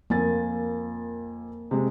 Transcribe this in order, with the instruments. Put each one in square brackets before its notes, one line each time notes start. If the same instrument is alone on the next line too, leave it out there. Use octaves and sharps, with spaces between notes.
[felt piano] F2 G#5 A6 [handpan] A#3
[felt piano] C3 G#3